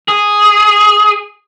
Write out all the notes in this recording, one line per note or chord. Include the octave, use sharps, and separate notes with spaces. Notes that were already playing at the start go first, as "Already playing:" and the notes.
G#4